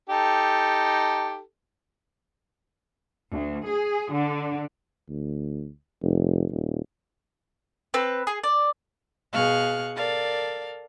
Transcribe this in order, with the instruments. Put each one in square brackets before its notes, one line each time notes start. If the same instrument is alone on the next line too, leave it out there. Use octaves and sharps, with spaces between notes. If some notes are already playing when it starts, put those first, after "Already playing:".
[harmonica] D#4 G4 A4
[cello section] D2
G#4
D3
[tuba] D2
F1
D#1
[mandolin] C4 B4
G#4
D5
[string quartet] B2 G#4 F5 C#6 F6 F#6
A4 A#4 D5 F5